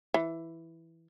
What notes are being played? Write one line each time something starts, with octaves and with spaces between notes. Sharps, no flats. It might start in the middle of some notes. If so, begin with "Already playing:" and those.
E3